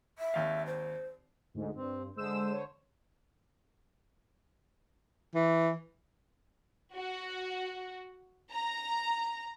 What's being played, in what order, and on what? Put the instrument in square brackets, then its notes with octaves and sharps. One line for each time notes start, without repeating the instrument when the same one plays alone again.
[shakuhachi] E5
[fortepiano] G#1 D#2 F5
[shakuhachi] C5
[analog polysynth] D2 G#2
[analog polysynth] G2 [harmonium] C4
[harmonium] D3 C5 [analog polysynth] G#3 E6 E7
[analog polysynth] C#5
[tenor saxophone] E3
[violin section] F#4
A#5